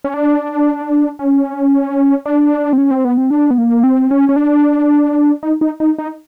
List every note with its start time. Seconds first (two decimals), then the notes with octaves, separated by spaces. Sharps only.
0.04 C#4
0.14 D4
1.19 C#4
2.26 D4
2.73 C4
2.78 C#4
2.91 C4
3.05 B3
3.18 C4
3.31 D4
3.51 B3
3.58 A#3
3.84 C4
4.11 C#4
4.29 C#4
4.36 D4
5.43 D#4
5.61 D#4
5.80 D#4
5.98 D#4